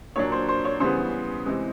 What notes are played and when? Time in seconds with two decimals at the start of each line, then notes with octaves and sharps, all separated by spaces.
0.16 A#2 F#3 A#3 D4 C#5
0.32 C5
0.48 C5
0.65 C#5
0.80 C#3 E3 G3 B3 C5
1.45 C3 E3 G#3